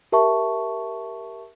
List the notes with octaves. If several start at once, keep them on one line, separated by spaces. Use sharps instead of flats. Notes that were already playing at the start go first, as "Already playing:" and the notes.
G4 A#4 E5 A5 C#6